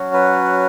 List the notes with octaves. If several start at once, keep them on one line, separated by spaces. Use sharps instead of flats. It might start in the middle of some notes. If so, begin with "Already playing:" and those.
Already playing: F#3 C#4 F#4
B4